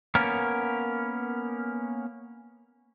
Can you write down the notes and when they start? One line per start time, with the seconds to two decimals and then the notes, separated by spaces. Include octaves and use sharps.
0.15 A#3 B3 C#4 A#4